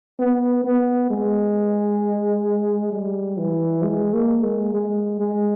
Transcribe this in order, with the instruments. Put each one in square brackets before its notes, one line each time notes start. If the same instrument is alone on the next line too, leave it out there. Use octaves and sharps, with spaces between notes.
[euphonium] B3
B3
G#3
G3
E3
G#3
A#3
G#3
G#3
G#3